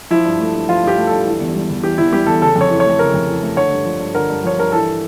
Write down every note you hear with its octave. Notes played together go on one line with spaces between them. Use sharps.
F3 E4
G2
A3
G2
F3 F4
G2 G4
A3
G2 A4
E3
E2
G3
E2
E3 G4
E2 E4
G3 G4
E2 A4
C#3 A4
F2 C#5
E3
C#5
A3
C#3 A#4
F2
E3
A3
D3 C#5
G2
F3
G2
D3 A#4
G2
F3 C#5
G2 A#4
E3 A4